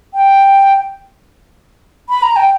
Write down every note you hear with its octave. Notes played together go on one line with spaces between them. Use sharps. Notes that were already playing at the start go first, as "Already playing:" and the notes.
G5
B5
A#5
G5